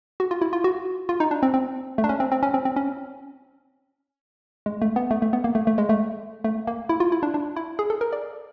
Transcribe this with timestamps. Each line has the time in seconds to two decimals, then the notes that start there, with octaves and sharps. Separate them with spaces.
0.20 F#4
0.31 F4
0.41 E4
0.53 F4
0.64 F#4
1.09 F4
1.20 D#4
1.31 D4
1.43 C4
1.54 C4
1.98 A3
2.04 D4
2.09 C#4
2.20 C4
2.32 C4
2.43 C#4
2.54 C4
2.65 C4
2.76 C#4
4.66 G#3
4.82 A3
4.96 B3
5.11 A3
5.22 A3
5.33 B3
5.44 A#3
5.55 A3
5.67 A3
5.78 G#3
5.89 A3
6.44 A3
6.67 A#3
6.89 E4
7.00 F4
7.12 E4
7.23 D4
7.34 D4
7.56 E4
7.79 G#4
7.90 A4
8.01 A#4
8.13 D5